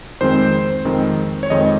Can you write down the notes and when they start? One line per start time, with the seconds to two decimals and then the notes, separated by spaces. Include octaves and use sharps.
0.21 F2 D#3 G#3 C4 C5
0.85 F2 D#3 G#3 C4
1.43 C#5
1.50 F2 D#3 G#3 C4 D#5